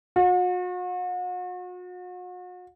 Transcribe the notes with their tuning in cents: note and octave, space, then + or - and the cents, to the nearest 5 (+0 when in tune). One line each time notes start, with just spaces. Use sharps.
F#4 -40